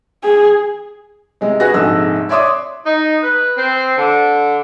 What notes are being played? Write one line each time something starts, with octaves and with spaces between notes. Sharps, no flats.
G#4
C3 G#3
F#4 G#4 B4 F#6 A#6
A#1 G#2 C3 A4 E6
C#5 D5 E5 C6 D6 D#6
D#4
B4
C4
D3